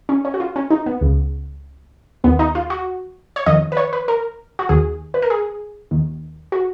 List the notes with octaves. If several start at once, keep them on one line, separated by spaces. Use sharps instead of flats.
C#4
C#4
F#4
F4
C#4
D#4
B3
C#2 C#3
D#2 D#3 B3
D#4
F4
F#4
C#5
F2 D#3 D#5
B4
C#5
B4
A#4
F#4
D#2 D#3 G#4
B4
A#4
G#4
D#2 D#3
F#4